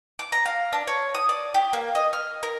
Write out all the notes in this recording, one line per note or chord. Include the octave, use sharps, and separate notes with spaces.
D6
A#5
F5
D4
C#5
D#6
D5
G4
A#3
D#5
F6
A#4